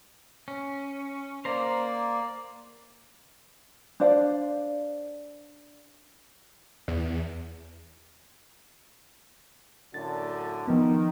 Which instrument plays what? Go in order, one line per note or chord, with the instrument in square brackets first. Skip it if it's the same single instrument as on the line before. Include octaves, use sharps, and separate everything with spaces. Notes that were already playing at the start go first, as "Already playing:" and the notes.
[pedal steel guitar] C#4
[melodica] A#3 D5 [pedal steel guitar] C5 A#5
[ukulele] D4 C5 D5 F5
[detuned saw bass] E2
[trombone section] F#2 A2 D3 [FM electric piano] A6
[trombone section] D#3 [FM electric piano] F3 B3